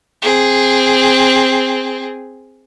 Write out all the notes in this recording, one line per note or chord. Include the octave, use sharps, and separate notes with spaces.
C4 G#4